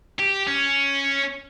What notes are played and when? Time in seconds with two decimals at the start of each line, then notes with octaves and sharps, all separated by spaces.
0.19 G4
0.47 C#4